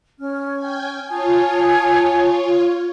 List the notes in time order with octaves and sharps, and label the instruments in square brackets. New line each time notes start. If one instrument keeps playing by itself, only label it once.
[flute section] C#4 F6
[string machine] G5 G#5
[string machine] F4 C#5 [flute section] G#5 A5 D#6